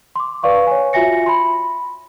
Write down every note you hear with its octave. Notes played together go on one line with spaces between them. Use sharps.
C6 D6
B4 D5 F5 C#6
C#5 G#5
F4 F#4 E5 G#5 A#6 C#7
B5 C6